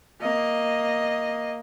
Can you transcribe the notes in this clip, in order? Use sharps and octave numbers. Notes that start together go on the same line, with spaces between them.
A#3 D#5